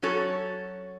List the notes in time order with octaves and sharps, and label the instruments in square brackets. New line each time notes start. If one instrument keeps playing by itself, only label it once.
[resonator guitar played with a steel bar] F#3 C#4 F#4 A4 C#5